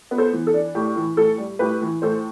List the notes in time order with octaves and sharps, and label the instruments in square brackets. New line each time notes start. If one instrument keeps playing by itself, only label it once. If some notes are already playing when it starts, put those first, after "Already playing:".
[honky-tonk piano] B3
A4 C5
E3
A4
D4
A2 G4
E3
A2 A4
G3
A2 G4 B4
E3
A2 A4 C5